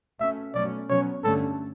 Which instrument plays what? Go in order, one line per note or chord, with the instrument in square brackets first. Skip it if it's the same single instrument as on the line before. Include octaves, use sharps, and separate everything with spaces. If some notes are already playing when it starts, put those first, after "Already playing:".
[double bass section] B2 A3 C#4 [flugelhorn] E5
[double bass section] B2 F#3 A3 C#4 [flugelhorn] D5
[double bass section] B2 F#3 C#4 [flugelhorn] C#5
[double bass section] G2 D3 A3 C#4 [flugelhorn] A4